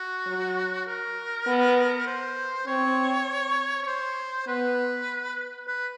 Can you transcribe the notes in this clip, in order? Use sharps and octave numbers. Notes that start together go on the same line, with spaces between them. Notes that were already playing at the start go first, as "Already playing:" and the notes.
Already playing: F#4
F#3
A#4
B3
C5
C4 C#5
C#5
C5
B3 B4
B4